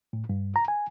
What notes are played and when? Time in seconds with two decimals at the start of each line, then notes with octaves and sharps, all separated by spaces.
0.13 A2
0.29 G2
0.56 A#5
0.68 G#5